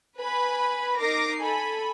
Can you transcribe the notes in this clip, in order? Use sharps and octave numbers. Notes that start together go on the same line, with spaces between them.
B4 G#5 B5
D#4 A#4 D6 A#6 C7
A4 G#5 B5